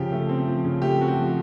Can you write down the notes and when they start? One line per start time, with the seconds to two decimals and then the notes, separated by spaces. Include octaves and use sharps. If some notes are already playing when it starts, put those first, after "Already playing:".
Already playing: C#3 F3 G4
0.12 A3
0.29 C4
0.48 F3
0.65 C#3
0.82 A3 G4
1.00 C4 F#4
1.08 G4
1.17 F3